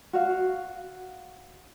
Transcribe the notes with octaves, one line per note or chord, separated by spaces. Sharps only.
F#4 F5